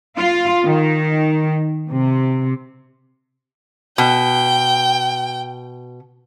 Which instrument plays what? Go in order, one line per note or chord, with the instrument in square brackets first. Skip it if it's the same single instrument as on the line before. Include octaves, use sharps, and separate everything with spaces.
[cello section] F4
D#3
C3
[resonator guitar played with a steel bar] B2 [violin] G5